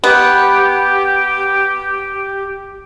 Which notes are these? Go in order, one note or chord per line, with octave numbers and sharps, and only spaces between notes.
B3 G4